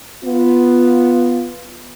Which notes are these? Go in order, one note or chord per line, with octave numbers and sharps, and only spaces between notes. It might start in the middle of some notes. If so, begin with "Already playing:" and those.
B3 F4